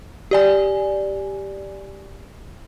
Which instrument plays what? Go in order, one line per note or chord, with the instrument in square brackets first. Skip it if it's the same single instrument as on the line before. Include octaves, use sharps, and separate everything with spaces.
[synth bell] G4 D5 G#5